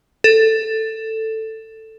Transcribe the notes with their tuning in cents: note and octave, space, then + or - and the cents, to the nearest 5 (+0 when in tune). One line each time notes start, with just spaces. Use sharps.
A4 +10